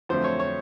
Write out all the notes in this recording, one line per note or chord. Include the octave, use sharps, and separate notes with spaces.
F2 D3 F#3 A3 C4 C5
C#5
C#5